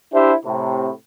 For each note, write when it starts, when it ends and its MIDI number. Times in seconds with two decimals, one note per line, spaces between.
0.13 0.33 62
0.13 0.33 64
0.13 0.33 67
0.13 0.33 72
0.13 0.33 76
0.45 0.90 45
0.45 0.90 48